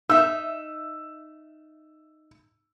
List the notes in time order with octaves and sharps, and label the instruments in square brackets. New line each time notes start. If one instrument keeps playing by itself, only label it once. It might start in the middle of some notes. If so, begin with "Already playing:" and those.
[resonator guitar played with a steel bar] D#4 E5 [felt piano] E6